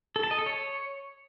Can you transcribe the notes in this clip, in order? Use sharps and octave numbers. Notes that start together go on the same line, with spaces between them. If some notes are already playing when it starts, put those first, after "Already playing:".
A4
A5
D#5
A4
C#5